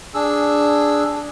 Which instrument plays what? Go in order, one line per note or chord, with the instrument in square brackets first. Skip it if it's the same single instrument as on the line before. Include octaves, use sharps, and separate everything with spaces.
[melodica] D4 G#4 E6